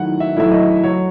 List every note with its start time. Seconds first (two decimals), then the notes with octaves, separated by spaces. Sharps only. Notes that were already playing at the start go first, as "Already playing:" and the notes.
Already playing: D#3 F#3 A3 E4 F#5
0.20 E5
0.37 F#3 A3 E4 E5
0.52 D#5
0.83 F#3 C#5